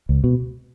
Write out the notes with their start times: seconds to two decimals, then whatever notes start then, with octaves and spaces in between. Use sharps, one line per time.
0.09 C#2
0.24 B2